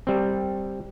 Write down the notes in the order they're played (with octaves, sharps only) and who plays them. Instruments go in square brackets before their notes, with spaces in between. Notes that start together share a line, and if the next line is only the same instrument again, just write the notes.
[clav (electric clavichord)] G3 C4